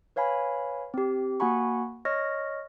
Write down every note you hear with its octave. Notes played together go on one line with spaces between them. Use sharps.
B4 C#5 F5 G#5 B5
C4 G4
A#3 F#4 F#5 G#5 B5 C#6
C#5 D#5 C#6 F6 A#6